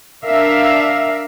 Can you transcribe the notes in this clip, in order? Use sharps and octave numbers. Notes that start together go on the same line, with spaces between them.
D4 A#4 E5 F5